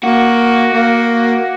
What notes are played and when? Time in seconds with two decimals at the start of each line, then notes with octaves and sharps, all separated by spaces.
0.04 A#3 F#4
0.73 A#3